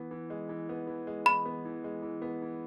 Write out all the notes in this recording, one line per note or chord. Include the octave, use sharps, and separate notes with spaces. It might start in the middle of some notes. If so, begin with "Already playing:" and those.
Already playing: E3 B3
E3
G#3
E3
B3
E3
G#3
E3 B5
B3
E3
G#3
E3
B3
E3